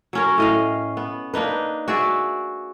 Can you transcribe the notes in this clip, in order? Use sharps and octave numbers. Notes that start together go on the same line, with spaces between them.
F#3 C#4 A#4
A2 D#5 F5
B3
A#3 D4 D#4 B4
F#4 G#4 D5 E5